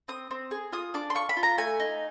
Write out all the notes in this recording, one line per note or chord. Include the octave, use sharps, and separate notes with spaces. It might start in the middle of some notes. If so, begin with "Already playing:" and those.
C4 D#6
C4
G#4
F4 D#6
D4 D6
C6
F4 C#6
B5
F4
A#5
A3 G#5
D#4